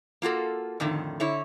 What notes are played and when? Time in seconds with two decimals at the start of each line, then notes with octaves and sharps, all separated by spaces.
0.22 A#3 F4 F#4 A4
0.80 F2 A2 D3 D#3
1.20 D3 E4 C#5